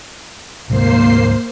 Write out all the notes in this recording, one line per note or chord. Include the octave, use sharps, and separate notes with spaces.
D2 G#2 C3 A#3 C5 C7